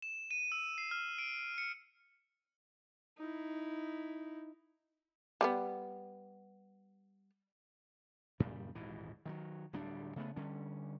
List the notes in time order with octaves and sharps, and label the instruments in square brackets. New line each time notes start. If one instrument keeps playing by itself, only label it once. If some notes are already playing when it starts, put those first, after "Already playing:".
[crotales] E7
D#7
E6
C7
F6
D7
C#7
[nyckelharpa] D#4 E4
[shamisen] G3 G#3 B3
[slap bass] F#2 A#2 C#3 G3
D#1 G#1 G#2 E3
D#3 F3 F#3
D1 D2 G3 D4
C#3 A3 B3
D3 G3 C#4